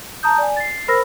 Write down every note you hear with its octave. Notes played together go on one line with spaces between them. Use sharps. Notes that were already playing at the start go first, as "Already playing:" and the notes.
A5 A#5 D#6 G6
D5 G#5
A6 C7
A#4 C5 B5 E6 F6 A#6